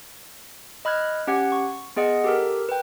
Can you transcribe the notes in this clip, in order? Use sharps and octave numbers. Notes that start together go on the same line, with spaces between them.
D#5 B5 F6 F#6 G#6
C#4 G4 F#5 G#6
C#6
B3 G#4 D#5 F#5
G4 A4 A#4
B4 G5